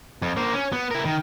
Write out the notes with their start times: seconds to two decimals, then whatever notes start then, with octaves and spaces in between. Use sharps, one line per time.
0.22 F2
0.37 A#3 C5
0.54 C#4
0.72 B3
0.91 E4 A#4
1.05 D#3